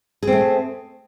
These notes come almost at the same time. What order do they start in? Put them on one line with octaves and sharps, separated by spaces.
G#4 C4 A3